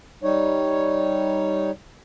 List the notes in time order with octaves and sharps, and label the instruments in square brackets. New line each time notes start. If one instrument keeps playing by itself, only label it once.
[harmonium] G3 D#4 C#5